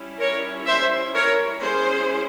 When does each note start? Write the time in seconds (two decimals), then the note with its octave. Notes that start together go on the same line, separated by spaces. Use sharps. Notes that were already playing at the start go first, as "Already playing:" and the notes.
Already playing: G3 C#4 E4
0.19 A#4 C#5
0.66 C5 E5
1.14 A#4 C#5
1.61 G3 C#4 E4 G#4 C5